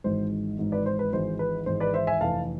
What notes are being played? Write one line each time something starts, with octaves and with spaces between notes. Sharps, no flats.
G#1 G#2 E3 G#3 C5
G#1 G#2 E3 G#3
B4 D5
C5
B4
G#1 G#2 E3 G#3 C5
B4
G#1 G#2 E3 G#3 C5
B4 D5
C5 E5
E5 G#5
F1 F2 E3 F5 A5